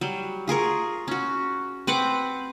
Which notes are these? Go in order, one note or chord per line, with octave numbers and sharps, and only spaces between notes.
F#3 G3
F4 G#4 A#4 C#6
C#4 F#4
C4 B4 F#5 D6